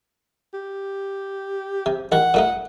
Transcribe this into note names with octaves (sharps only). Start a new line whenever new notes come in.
G4
C3
A1 D#3 F#5
A#2 A3 D#4